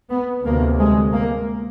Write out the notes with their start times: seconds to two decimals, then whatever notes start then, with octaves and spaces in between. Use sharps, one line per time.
0.10 B3
0.44 D2 C3 A#3
0.78 G#3
1.13 A#3